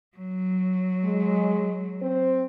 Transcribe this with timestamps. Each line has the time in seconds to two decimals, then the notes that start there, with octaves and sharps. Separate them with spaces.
0.17 F#3
1.05 G#3
2.02 C4 C5